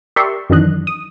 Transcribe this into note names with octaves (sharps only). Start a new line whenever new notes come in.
G4 A#4 D5 E5 C6 C#6
F#2 D#3 E3 D4 D#5 F#6
D#6